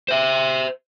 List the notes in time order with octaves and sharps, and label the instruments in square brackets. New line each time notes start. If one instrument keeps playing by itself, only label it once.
[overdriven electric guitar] C5 E5